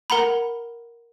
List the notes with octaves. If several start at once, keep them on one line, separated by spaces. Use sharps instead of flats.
A#4 F#5 A#5 B5